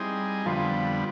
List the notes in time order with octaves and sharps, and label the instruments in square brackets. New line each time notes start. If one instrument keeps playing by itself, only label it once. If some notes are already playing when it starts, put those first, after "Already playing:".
Already playing: [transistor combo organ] G3 C4 D#4 G#4 [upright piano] E4
[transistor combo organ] F2 D3 G3 B3 [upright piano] F3 F4